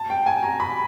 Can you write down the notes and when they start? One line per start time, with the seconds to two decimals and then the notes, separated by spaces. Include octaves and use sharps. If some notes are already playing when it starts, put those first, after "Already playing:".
Already playing: A5
0.10 G5
0.26 G#5
0.43 A#5
0.60 B5